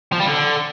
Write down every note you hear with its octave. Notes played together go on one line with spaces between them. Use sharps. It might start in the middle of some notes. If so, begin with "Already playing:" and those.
F3
G3
D3